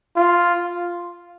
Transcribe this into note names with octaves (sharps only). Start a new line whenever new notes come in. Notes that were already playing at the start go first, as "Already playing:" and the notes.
F4